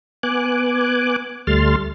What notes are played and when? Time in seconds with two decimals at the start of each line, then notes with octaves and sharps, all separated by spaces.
0.23 B3 G#5 D6 F#6
1.47 D2 G3 A3 C6 F6 A6